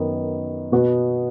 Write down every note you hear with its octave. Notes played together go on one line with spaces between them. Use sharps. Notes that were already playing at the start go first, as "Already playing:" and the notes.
Already playing: F#2 D#3 B3 D#4 B4
B2 B3 F#4